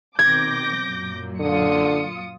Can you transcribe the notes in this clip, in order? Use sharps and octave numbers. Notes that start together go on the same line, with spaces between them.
B2 D#3 C4 D6 G6 G#6 A#6
F#2 A#2 F#3
D3 F4 D#6 C#7